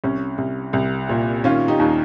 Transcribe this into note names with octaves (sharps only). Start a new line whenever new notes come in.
C2 C#4
C2
C2
A#2
D#3 C#4 F4
D#4 G4
D#2